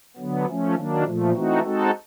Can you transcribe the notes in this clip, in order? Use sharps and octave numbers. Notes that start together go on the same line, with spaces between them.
D3 F#3 B3
F3 A3 C#4
D#3 F#3 A#3 D4
A#2 F3 A3
E3 A3 C4 D#4 F#4
G#3 C4 D#4 F#4 A4